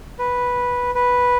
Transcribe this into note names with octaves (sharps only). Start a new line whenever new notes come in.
B4
B4